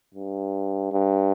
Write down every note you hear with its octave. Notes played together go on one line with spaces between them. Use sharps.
G2
G2